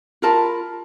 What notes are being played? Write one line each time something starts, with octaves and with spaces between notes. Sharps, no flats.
F4 A#4 A5 B5